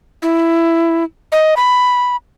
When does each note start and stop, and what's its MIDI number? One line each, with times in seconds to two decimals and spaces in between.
0.22 1.04 64
1.32 1.55 75
1.57 2.16 83